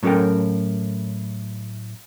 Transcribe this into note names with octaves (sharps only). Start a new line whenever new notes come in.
A2 F#3 C#4 A4 A#4 G5